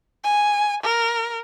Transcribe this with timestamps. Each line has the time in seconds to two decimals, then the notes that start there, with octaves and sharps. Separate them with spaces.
0.24 G#5
0.83 A#4